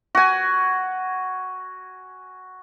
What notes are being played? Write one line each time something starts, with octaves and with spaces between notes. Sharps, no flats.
F#4 G#5